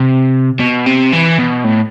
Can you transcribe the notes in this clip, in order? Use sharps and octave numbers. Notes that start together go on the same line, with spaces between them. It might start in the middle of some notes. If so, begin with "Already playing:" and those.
Already playing: C3
B2
C3
E3
B2
A2